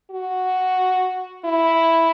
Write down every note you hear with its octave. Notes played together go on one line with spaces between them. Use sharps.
F#4
E4